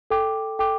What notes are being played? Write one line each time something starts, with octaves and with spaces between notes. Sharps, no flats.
A4 G5 D6
A4 G5 D6